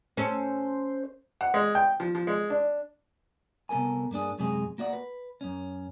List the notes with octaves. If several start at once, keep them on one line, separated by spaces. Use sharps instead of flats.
C#4 A4 C5
F#5
G#3
G5
F3
F3
G#3
D4
C2 B3 A4 A#4 G#5
G2 A#3 D4 G#4
F#2 C3 F#3 G#3 G#4
A#3 F#4 D5 D#5 F#5
B4
F#2 C#4